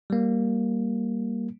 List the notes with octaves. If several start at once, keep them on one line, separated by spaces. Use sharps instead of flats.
G3 A#3